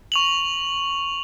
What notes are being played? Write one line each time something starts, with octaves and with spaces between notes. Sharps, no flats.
C#6 F7 F#7